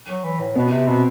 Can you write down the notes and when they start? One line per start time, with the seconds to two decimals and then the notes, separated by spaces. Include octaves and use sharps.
0.10 F#3
0.24 E3
0.40 A2
0.55 B2 B3
0.71 C3
0.87 B2 C4